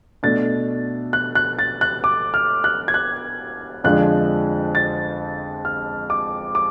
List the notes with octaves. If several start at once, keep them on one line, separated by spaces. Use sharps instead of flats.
B2 A3 D4 A6
F#6
F#6
A6
F#6
D6
F6
F#6
G#6
F#6
F2 D3 F3 G#3 D4 F#6
A6
F6
D6
D6